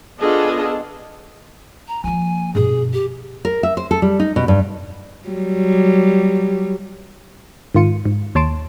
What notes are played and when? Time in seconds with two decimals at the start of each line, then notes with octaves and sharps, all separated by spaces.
0.20 B3 D4 F4 G#4 A4 D#5
1.88 A#5
2.04 F3 A#3 G#5
2.55 G2 B2 G#4
2.93 G4
3.45 A#4
3.63 E5
3.77 C5
3.91 A4
4.02 G3
4.20 D#4
4.36 B2
4.48 G2
5.29 F#3 G3
7.74 G#2 D#3 F4 C#7 D#7
8.05 G#2
8.35 D#2 C#5 A5 C6 D7 E7